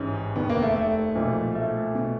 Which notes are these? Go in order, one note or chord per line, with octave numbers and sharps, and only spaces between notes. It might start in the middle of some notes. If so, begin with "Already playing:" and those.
Already playing: A1 G#2 E3 C#4
F1 D#2 D#3 B3
A#3
A3
A3
B1 A#2 F3
A3
B2